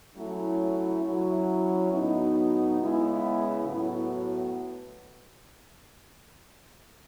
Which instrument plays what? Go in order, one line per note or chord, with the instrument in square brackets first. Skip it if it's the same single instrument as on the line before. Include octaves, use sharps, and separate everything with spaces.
[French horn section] F#3 A3 C#4 E4
F#3 C#4 E4
A2 F#3 B3 D#4 F#4
C#3 G#3 B3 E4
A2 F#3 B3 F#4